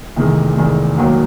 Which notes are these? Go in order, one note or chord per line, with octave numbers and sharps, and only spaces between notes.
F1 E2 C3 D#3 G#3
F1 E2 C3 D#3 G#3
E1 D#2 D#3 F#3 A#3